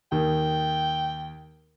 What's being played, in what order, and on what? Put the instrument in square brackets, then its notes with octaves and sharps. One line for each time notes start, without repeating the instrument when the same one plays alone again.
[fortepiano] D#2 D#3 [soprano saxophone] G5